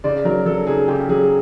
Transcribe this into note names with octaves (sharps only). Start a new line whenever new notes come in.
C#3 D5
F#3 A#4
F#3 A4
C#3 G#4
C#3 G4
F#3 G#4